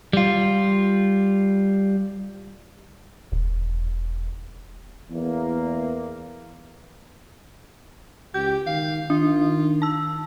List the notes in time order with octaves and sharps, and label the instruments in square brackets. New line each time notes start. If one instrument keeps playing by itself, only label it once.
[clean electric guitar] G3 F4
[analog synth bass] E1
[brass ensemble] E2 A#3
[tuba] C#2 [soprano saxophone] G4 [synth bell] G6
[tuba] D#3 [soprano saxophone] F5
[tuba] D#3 [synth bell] D4 [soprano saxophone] F4
[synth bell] A5 E6